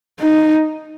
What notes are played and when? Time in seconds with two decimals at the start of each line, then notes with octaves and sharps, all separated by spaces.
0.20 D#4